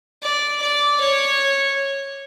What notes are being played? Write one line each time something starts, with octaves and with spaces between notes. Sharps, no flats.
D5
D5
C#5